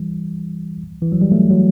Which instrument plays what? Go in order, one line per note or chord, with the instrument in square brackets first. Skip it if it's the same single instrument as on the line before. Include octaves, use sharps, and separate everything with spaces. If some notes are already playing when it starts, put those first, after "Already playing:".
Already playing: [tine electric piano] E3 G3
E3
F#3
G3
F#3 A3
F#3